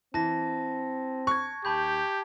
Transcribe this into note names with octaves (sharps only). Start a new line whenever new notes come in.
E3 C4 A5 A#6
C#6 F#6 G#6
D#2 G4 A5 B5 G6